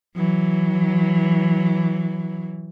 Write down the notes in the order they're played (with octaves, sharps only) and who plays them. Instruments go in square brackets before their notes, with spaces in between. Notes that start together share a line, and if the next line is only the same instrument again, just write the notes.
[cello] E3 F#3